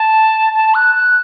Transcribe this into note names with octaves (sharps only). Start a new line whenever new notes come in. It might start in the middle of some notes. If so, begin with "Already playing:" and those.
Already playing: A5
A5
F#6
F#6